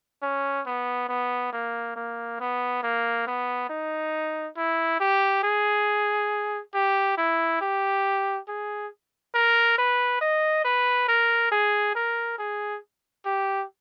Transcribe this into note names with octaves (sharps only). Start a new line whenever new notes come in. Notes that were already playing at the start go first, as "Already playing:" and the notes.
C#4
B3
B3
A#3
A#3
B3
A#3
B3
D#4
E4
G4
G#4
G4
E4
G4
G#4
A#4
B4
D#5
B4
A#4
G#4
A#4
G#4
G4